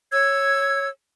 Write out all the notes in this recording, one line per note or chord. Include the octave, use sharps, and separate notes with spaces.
C#5 E6 G#6